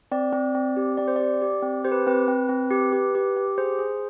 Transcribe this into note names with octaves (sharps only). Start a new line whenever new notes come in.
C4 D5
C4
C4
G4
C4 D5
C5
G4 D5
G4
C4
G4 C5
B4
C4 B4
C4
C4
G4
G4
G4
G4
G#4 C5
G#4